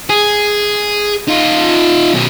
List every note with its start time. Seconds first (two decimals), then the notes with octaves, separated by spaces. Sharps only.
0.10 G#4
1.28 D#4 F4
2.14 B2 C#4